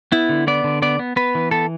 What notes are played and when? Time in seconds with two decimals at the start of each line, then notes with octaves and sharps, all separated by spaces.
0.12 B3 E4
0.29 D3
0.47 B3 D5
0.64 D3
0.82 B3 D5
0.99 B3
1.16 B3 B4
1.35 E3
1.51 B3 A4